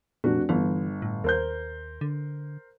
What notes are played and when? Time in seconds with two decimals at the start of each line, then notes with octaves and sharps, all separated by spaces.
0.24 F1 A#2 D4 F#4
0.49 G1 E3
1.02 A2
1.24 D#2 A#4 C5 G6
2.01 D3